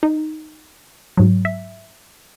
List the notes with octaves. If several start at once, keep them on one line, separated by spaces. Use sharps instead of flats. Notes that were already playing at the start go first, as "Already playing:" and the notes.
D#4
G#2 F#3
E5